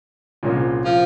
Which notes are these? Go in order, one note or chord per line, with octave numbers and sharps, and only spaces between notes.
C2 A#2 G#3 C#4 F4
F3